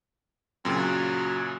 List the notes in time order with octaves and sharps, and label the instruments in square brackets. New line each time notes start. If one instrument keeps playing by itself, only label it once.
[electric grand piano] F#2 A#2 C#3 [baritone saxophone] C4
[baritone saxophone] F#3